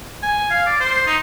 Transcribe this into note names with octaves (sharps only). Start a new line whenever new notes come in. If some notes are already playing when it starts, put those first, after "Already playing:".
G#5
F5
D5
C5
D#4